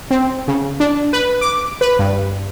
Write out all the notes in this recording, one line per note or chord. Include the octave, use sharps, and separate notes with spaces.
C4
C#3
D4
B4
D6
B4
G2